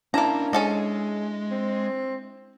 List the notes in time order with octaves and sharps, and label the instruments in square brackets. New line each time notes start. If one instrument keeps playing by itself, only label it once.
[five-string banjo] A#3 A#5 [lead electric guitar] C#4 C6 [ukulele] D4 E4 A5
[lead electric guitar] G#3 [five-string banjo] C#4 A4 D#5 [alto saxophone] G#4
[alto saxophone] C4